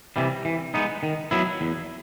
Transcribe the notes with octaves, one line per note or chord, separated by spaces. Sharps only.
C3 E3 G3
E3
G#3 B3 D#4
D#3
F#3 B3 E4
E2